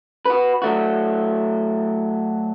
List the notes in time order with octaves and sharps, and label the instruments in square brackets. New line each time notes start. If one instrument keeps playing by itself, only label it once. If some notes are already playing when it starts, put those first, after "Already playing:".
[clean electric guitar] F#4 B4
F#3 A3 F#4